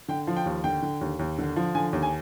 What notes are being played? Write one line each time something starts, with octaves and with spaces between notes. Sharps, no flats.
D3 G5
F3
G5
D#2
D3 G5
D3
D#2
D#2
D3
F3
D3 G#5
D#2
G#5